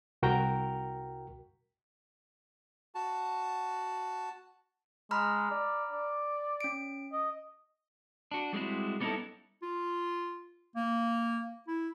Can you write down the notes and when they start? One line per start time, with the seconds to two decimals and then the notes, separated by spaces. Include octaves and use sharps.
0.23 C2 F#4 A#4 G5 A#5
2.95 F#4 A5
5.11 G#3 A#5 B5 F6
5.51 D5
5.92 D5
6.61 C#4 D7
7.13 D#5
8.32 D4 F#4
8.53 G3 G#3 C4 E4 F#4
9.00 G3 B3 C#4 D#4 E4 A4
9.62 F4
10.76 A#3
11.68 E4